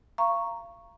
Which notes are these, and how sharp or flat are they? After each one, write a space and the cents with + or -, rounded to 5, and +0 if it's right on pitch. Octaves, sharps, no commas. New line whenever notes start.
F5 -30 A#5 +0 C#6 +0